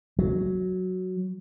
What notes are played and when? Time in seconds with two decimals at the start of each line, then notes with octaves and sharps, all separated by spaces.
0.19 F#3